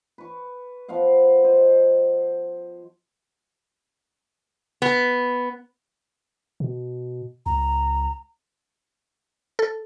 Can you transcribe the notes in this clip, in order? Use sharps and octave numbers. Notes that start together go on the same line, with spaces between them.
B4 C#6
F3 B3 F5 F#5
C5 D#5
B3
B2
C#2 A#5
A4